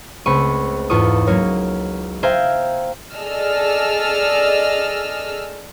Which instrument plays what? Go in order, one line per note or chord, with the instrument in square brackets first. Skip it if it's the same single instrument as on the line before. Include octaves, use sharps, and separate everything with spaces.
[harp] C#2 A3 C4 B5 C#6 D#7
E2 G#2 F4 A4 C#6 D#6
F#3 A#3 C#4 A#4 C#5
C5 E5 F5 G5 G#5 A#5
[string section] G#4 A4 D5 D#5 E6 F6